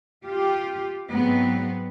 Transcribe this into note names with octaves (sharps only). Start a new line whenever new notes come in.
F4 G4
G#2 F#3 B3 C4